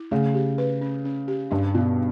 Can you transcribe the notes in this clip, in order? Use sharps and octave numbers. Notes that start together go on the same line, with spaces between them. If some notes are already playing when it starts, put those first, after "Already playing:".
Already playing: E4
C#3 A3
G4
B4
C#4
C#4
G4
G2 D4
B2 F#4